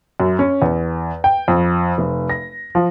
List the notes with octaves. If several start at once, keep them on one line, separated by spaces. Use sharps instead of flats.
F#2
C#4
E2
G5
F2
F1
A#6
F3